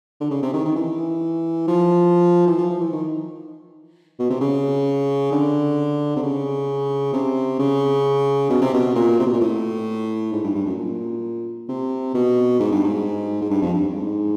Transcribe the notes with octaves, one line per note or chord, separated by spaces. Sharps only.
D3
C#3
C3
D#3
D#3
E3
F3
E3
F3
F3
E3
D#3
B2
C3
C#3
D3
C3
C#3
C3
C#3
B2
C3
B2
A#2
C3
B2
A#2
A2
G#2
G2
G2
F#2
A#2
C3
B2
G#2
G2
G#2
G#2
G2
F2
G2
G#2